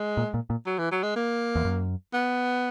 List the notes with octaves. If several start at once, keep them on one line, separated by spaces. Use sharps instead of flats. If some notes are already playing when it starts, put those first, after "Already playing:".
Already playing: G#3
A#2
A#2
A#2
F#3
E3
F#3
G#3
A#3
E2
F#2
B3